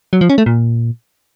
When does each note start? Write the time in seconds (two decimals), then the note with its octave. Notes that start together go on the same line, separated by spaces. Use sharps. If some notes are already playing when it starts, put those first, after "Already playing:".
0.13 F#3
0.21 F3
0.30 C#4
0.38 A3
0.46 A#2